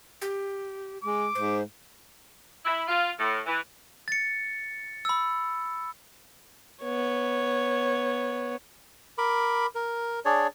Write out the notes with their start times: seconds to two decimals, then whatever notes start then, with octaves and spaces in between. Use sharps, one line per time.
0.22 G4
1.04 G#3 D6
1.35 G#2 C5
2.65 E4
2.88 F4
3.18 A2
3.46 E3
4.08 A6 C#7
5.05 B5 E6
6.82 B3 C#5
9.18 A#4 B5 D6
9.75 A#4
10.25 D4 G#4 C#5 D5